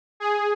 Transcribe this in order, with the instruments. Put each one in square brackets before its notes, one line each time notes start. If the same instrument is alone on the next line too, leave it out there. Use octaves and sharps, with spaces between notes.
[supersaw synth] G#4